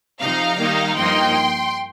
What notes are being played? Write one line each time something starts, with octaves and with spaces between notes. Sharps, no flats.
C3 F3 D#4 F5 A#5
D#3 G3 A#3 D#4
G2 F3 A#3 D#4 G5 C6